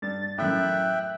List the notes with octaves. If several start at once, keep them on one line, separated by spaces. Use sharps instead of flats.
G2 A6
F#2 A2 E5 G5 F#6